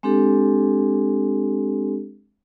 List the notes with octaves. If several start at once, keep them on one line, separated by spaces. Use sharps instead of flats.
G#3 C4 D4 G4 A4